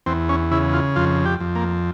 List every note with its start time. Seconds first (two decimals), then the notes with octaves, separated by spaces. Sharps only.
0.06 E2 C4
0.29 C#4
0.51 C#3 E4
0.73 F4
0.96 F2 F4
1.26 G4
1.40 F2
1.55 A#3